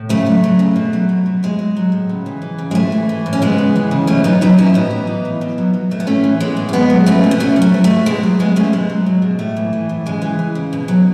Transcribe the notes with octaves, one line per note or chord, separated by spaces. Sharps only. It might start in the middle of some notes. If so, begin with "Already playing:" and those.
Already playing: A2
C#3 A3
F#3
F#3
C#3
B2
F#3
F#3
B2
A2 G#3
F#3
F#3
A2
C#3
E3
E3
C#3
G#3
A2 A3
E3
E3
A2
C#4
C#3 G#3 B3
E3
E3
C#3
B2 A3 C#4
F#3 B3 D#4
F#3 B3 D#4
B2 C#4 E4
A2 B3 D#4
E3
E3
A2
B2
F#3
F#3
B2 A3
B3
A2 A3 C#4
E3
E3 G#3 B3
A2
C#4
B2 G#3 B3
F#3
F#3 A3 C#4
B2
B3
B2 A3 C#4
F#3
A3
F#3
A3
B2
B2 G#3 B3
F#3
F#3 G#3 B3
B2 A3 C#4
B2 G#3
F#3
F#3
B2
A2 A3
E3
E3
A2
C#3 G#3
E3
E3
C#3
B2
F#3